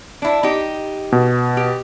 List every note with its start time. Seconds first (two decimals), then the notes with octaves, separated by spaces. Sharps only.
0.22 D4 E4
0.43 D#4 G4
1.12 B2
1.57 G4